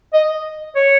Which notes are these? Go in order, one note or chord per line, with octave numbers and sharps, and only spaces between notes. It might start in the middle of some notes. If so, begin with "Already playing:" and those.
D#5
C#5